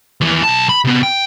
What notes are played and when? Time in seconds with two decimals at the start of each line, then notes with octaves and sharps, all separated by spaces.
0.21 D#2 E3
0.44 B1 A5
0.69 B5
0.85 C3 B3
1.03 G5